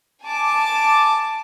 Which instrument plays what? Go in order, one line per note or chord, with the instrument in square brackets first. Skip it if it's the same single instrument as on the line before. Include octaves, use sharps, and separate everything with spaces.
[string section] G#5 A5 D6